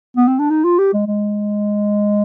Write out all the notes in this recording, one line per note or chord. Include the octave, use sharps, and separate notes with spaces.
B3
C4
D4
D#4
F4
G4
G#3
G#3